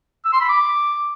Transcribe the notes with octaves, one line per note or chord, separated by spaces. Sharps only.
E6
C6
B5
D6